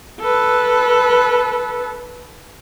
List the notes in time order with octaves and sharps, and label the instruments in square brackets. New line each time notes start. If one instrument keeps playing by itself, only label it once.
[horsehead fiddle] A4 B4